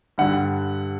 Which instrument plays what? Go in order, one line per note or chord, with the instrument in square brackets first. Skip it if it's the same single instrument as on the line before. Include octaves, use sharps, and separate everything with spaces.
[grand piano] G2 D3 G3 F#5